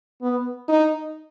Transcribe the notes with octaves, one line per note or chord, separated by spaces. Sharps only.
B3
D#4